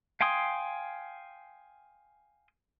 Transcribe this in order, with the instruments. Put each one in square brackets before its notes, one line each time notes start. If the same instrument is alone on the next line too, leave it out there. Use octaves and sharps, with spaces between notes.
[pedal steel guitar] F5 G5 G#5 C6 D#6